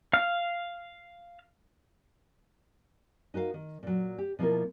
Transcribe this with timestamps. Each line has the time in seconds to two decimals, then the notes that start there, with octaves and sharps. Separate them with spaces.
0.13 F5 F6
3.34 D#4 F#4 A#4 F5
3.54 D#3
3.83 A#2 F#3
4.18 G4
4.39 B2 F3 A#3 E4 A4 A#4